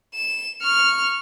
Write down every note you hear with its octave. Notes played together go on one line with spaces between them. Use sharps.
E7
C#6 F6